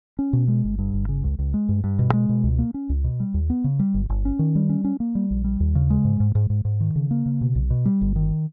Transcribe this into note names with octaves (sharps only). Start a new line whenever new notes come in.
C#4
B2
G#3
G1
G2
G1
C#3
C#2
C#2
G#3
G2
G2
B2
G#3
B2
C#2
A#3
C#4
C#2
B2
G3
D#2
B3
C#3
G3
G1
G1
C#4
D#3
G3
C#4
C#4
A#3
G3
A#1
G3
D#2
C#3
G#3
G#2
G#2
G#2
G#2
G#2
D#3
C#3
A#3
C#3
B2
B1
B2
G3
G1
D#3